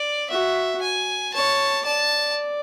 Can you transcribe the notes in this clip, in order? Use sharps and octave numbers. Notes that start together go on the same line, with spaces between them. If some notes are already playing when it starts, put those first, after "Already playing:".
Already playing: D5
F#4 E5
G#5
C#5 A5
D5 A5